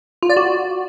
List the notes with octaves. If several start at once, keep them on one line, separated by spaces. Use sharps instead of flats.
F4
D5
F#4